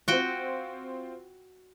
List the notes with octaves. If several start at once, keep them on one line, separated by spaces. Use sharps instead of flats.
C4 F4 F#4 G5